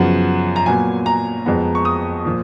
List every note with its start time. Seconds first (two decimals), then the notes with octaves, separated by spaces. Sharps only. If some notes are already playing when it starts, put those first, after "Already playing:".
Already playing: F#2 C#3 F3 B3 F#5
0.56 A#5
0.66 A#2 F#3 B3 G#5
1.06 A#5
1.46 F2 F3 G#3 B3
1.75 C#6
1.85 D#6
2.25 A#2 F3